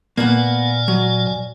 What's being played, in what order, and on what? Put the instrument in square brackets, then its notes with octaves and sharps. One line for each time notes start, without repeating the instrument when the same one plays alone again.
[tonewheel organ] A#2 D5 G#5 [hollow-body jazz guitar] A#3 B3 F#5
[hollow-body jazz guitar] F#3